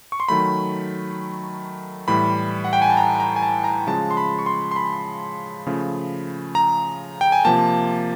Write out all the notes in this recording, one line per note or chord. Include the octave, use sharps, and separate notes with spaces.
C#6
C6
D#3 F#3 A3 B5
A2 E3 G3 B5
F#5
G5
G#5
A5
A#5
A#5
G#5
A5
A#5
C#3 F3 G#3 A5
C6
B5
C#6
C6
C6
B5
C#3 F3 A3
A#5
G5
G#5
C3 F3 A#3 A5